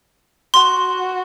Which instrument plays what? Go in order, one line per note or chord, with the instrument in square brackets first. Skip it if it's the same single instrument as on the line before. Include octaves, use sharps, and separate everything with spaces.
[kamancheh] F#4 [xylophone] C6